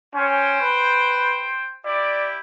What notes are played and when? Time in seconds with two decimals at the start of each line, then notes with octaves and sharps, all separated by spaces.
0.14 C#4 C5 G5
0.61 B4
1.85 E4 G4 D5